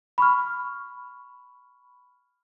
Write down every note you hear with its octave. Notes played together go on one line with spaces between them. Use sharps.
B5 C#6 F6